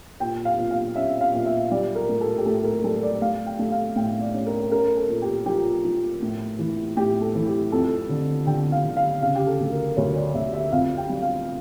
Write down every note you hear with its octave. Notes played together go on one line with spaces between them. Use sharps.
A#2 G5
F5
A#2
F5
C#4 E5
F5
A#2
E5
G3 D5
A#4
A2
A4
G4
A2 A4
A#4
G3 A4
D5
A3 F5
G5
A3
F5
A2 G5
D5
C#4
A#4
C#4 A#4
A4
A#2
G4
F3 G4
F3
A2
E3
A2 G4
A4
E3
G4
F2 A4
D3
D3 G5
F5
D3
F5
C#3 F5
G4
A4
D2
A#4
D2 C#5
D5
D2 E5
E5
F2 F5
G5
G3
F5